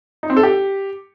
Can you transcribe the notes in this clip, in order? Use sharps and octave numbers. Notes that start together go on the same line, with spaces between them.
D#4
C4
A4
G4